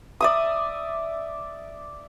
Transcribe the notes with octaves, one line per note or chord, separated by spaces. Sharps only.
D5 E5 D#6